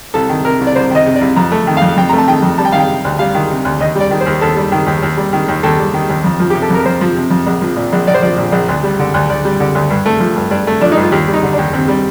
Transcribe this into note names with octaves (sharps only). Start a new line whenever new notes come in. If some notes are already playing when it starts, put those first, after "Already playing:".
C2 A4
D#3
C3 A#4
C2
D5
C2 C5
D#3 D#5
C3
D5
C2
F2 A#5
A3
D#3
F5
F2
F2 G5
A3 A#5
A5
D#3 G5
F2
G3 A5
G5
D#3 F5
G5
C3
D2
G3 F5
D#3
C3
D2
D#2 D#5
G3
D5
D#3
C5
D#2
D#2 A4
G3
D#3
D#2
D#2
G3
D#3
D#2
D#2 A4
G3
D#3
D#2
F2
F3
C3 G4
A4
F2 A#4
F2 C5
F3
C3
F2
A#1
F3
A#2
A#1
A#1 D5
C5
F3 D5
A#2
A#1
D2
G3
D3
D2
D2 D5
G3
D3
D2
G2
A3
F3
G2
G2 D5
A3
F3 D4
D#4
G2 F4
D#2 G4
G3
D#4
D3
D4
D#2
D#2 C4
G3